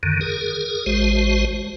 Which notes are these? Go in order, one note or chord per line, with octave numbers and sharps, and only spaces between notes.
F#2 D3 D#3
G#4 A#4
A1 G#3 F#4 C5